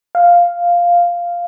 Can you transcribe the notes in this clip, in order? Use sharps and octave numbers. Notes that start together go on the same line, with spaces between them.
F5